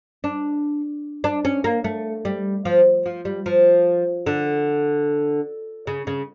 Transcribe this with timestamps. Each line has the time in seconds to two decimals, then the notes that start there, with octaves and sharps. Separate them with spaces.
0.24 D4
1.24 D4
1.45 C#4
1.64 A#3
1.84 A3
2.25 G3
2.65 F3
3.06 F3
3.25 G3
3.46 F3
4.26 D3
5.87 C#3
6.07 C#3